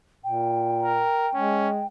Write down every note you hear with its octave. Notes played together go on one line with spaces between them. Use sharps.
A#2 G5
A#4
G#3 C#4